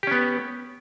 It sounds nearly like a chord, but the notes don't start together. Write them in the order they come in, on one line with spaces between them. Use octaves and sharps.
G4 C#4 B3